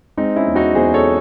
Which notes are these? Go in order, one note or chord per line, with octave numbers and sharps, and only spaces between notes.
G#3 C4 D#4
C#4 E4
E2
D#4 F#4
E2 G#4 C5
A4 C#5